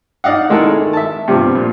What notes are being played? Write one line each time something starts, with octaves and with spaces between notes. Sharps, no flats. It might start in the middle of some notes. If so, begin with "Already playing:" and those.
D#4 D5 D#5 F5 F#5
D#3 G#3 E4 A4 A#4
D#3
E5 A5
G2 C3 F3 B3
A#2